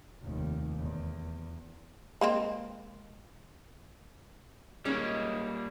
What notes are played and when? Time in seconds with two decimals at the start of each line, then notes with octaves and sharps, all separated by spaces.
0.23 F1 D#2
0.80 E2
2.21 G#3 A#3 C4
4.85 G3 G#3 A#3 C#4 D#4